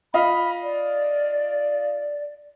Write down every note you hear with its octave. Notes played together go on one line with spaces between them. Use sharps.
F4 D#5 F5 B5
D5